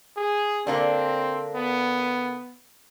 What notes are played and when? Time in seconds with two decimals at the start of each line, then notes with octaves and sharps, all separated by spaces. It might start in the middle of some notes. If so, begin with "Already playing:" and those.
0.17 G#4
0.67 D3 A#3 C4 D4
1.55 B3